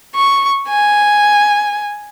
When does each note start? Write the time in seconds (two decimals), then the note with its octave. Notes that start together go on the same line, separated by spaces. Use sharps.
0.15 C#6
0.69 G#5